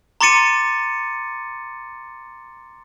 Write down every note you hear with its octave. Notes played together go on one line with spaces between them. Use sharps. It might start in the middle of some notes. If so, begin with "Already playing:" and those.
A#5 C6 D6 A6 C#7 D#7